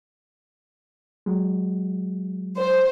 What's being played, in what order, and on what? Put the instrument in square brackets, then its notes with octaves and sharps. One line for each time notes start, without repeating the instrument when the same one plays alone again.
[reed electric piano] F#3 G#3
[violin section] C5